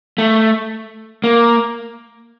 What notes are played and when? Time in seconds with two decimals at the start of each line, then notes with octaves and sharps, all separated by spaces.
0.18 A3
1.24 A#3